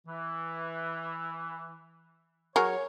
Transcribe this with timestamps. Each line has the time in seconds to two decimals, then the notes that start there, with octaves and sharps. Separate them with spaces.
0.07 E3
2.56 F#3 G#4 A#4 C#5